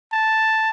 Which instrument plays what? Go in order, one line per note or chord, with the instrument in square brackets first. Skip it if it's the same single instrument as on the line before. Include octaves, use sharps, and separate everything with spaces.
[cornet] A5